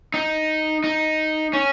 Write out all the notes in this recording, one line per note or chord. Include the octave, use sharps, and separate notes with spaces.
D#4
D#4
C#4